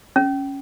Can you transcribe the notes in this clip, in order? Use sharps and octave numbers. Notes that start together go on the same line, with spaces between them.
C#4